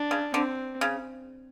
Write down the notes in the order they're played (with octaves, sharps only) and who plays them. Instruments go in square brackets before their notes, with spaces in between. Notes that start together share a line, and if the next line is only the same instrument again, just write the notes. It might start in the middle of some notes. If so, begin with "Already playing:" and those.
Already playing: [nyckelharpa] D4
[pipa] C#3
[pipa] D3 [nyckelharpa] C4
[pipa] C#3